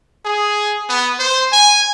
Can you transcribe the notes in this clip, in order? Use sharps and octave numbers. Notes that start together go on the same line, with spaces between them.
G#4
B3
C5
G#5